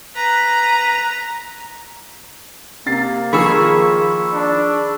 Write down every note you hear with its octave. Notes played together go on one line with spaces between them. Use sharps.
B4 A#5
C3 A#3 A6 C7
D#3 F3 G#4 B5 C#6 E6
D4